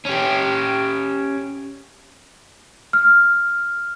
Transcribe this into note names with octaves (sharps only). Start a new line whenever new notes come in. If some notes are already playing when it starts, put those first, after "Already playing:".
C#4 G4
F6